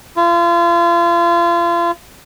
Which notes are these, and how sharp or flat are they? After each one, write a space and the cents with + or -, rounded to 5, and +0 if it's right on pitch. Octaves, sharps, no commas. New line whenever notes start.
F4 -35